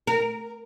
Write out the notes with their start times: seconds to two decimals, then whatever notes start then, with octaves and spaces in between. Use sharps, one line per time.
0.07 A#4